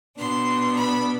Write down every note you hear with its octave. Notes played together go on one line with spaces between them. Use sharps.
B2 B3 D4 C6
B5